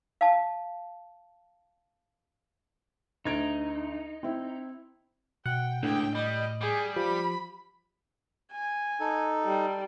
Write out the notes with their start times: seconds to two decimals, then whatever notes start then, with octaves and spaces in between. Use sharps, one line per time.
0.21 F5 A5
3.25 D2 D#4 G#6 D7
4.23 C4 E4
5.46 B2 F#5 G5
5.83 C#2 A2 D4 G5
6.15 G3 D#5 B5
6.61 G3 G#4
6.96 F3 G4 B5
8.52 G#5
9.00 D#4 A4
9.45 G3